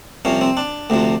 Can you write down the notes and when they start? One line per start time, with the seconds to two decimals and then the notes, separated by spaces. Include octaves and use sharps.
0.25 C2 C3 F3 C#4
0.41 C4
0.57 D4
0.90 D2 C3 F3